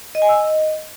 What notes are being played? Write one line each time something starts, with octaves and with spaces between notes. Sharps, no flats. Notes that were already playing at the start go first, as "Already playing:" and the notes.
D#5
G#5
E6
D#5